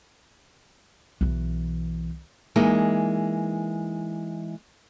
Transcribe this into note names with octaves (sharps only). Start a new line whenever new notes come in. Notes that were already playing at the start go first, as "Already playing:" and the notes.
B1 E3
E3 G#3 A#3 D#4